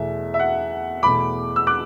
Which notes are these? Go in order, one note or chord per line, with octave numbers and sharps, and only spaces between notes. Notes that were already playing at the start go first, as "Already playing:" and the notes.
Already playing: E2 B2 A3 E5
E5
F#5
E2 B2 A3 B5 D6
E6
D6 F#6